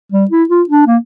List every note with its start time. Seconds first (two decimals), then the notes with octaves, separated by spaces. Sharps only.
0.12 G3
0.30 E4
0.49 F4
0.69 D4
0.87 A#3